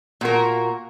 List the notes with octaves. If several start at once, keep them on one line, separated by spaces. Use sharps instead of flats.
A#2 F#4 A#4